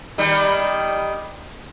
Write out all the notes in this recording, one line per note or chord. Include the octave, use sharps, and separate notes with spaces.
D#3 G3 D#4